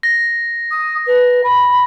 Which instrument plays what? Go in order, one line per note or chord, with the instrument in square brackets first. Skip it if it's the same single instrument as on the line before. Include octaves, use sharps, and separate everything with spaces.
[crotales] A#6
[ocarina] D#6
B4
B5